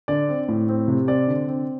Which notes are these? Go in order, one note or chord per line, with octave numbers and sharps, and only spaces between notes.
D3 D5
C4
A2
C4
C3
C4 D5
D3
C4